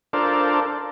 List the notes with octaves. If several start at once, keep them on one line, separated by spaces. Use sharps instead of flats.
D4 F4 A4 A#4 C5 D5